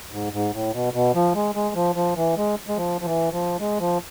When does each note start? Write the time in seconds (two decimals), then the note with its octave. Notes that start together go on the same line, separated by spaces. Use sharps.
0.12 G#2
0.33 G#2
0.53 A2
0.73 B2
0.93 B2
1.15 F3
1.35 G#3
1.55 G#3
1.76 F3
1.96 F3
2.16 E3
2.37 G#3
2.68 G#3
2.77 F3
3.01 F3
3.05 E3
3.32 F3
3.60 G#3
3.80 F3